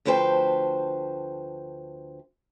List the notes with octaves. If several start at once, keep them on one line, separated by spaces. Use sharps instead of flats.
D2 F3 B4 C5 G5 A5